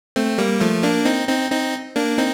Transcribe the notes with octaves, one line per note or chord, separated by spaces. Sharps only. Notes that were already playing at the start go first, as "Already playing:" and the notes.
A3 C4
G3 A#3
F3 A3
A#3 D4
C4 D#4
C4 D#4
C4 D#4
A#3 D4
C4 D#4